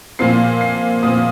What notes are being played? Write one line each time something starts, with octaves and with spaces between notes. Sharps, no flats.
A#2 F3 C4 C7
C7
A#2 F3 C4 D#6